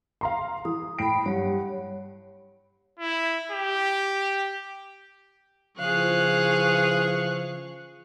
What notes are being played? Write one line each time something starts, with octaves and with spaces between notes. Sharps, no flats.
F5 A#5 C6
E3 D#6
A2 G5 B5 C7 D7
G2 F#3 G4 C#5
E4
G4
C#3 E3 F3 G#4 F5 C#6 F#6